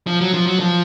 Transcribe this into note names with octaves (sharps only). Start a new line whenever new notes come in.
F3
F#3
F3
F#3
F3